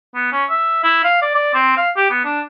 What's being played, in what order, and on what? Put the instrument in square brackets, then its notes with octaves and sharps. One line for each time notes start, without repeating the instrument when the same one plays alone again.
[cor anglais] B3
C#4
E5
E4
F5
D5
D5
C4
F5
G4
B3
D4